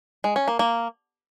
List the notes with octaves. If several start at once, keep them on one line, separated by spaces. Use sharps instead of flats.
G#3
C#4
A#3
A#3